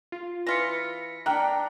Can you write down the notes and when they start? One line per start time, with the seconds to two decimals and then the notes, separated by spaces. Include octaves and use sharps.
0.12 F4
0.47 E3 F4 A#6 B6 C#7
1.26 A#3 D4 G5 A#5 F#6